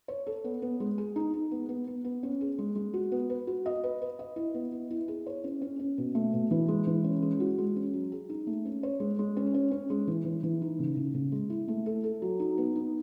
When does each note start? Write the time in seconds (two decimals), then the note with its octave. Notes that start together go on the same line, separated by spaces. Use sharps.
0.08 C#5
0.27 A4
0.44 B3
0.62 B3
0.80 G#3
0.98 G#4
1.16 D#4
1.34 D#4
1.51 B3
1.69 B3
1.87 B3
2.04 B3
2.23 C#4
2.41 G#4
2.58 G#3
2.76 G#3
2.94 F#4
3.12 B3
3.30 B4
3.47 F#4
3.66 D#5
3.83 B4
4.02 B4
4.19 D#5
4.36 E4
4.54 B3
4.72 E4
4.91 E4
5.08 G#4
5.26 C#5
5.44 C#4
5.61 C#4
5.79 C#4
5.98 B2
6.15 A3
6.33 B2
6.51 E3
6.68 G#3
6.87 E3
7.04 C#4
7.22 G#3
7.40 F#4
7.58 G#3
7.76 C#4
7.94 F#3
8.12 G#4
8.29 D#4
8.47 A3
8.65 C#4
8.83 C#5
9.00 G#3
9.19 G#3
9.37 C#4
9.54 C#4
9.71 C#4
9.90 G#3
10.07 E3
10.25 E3
10.43 E3
10.62 D#4
10.79 C#3
10.97 C#3
11.14 C#3
11.32 G#3
11.50 E4
11.68 A3
11.86 A4
12.04 A4
12.22 F#3
12.40 D#4
12.58 B3
12.76 D#4